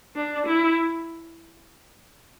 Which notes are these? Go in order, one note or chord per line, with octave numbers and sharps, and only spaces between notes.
D4
E4